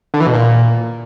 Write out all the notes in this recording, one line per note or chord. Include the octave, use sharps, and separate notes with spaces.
D3
E3
B2
A#2